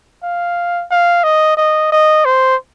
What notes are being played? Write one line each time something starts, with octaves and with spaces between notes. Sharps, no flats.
F5
F5
D#5
D#5
D#5
C5